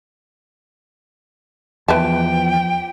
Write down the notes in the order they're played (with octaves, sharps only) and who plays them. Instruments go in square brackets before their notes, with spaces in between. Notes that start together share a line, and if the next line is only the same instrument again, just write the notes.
[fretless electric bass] E2 [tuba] F3 [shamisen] B4 E5 A5 [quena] G5